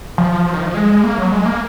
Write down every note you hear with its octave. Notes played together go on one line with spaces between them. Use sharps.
F3
F3
D#3
F3
G#3
A#3
F#3
G#3
A#3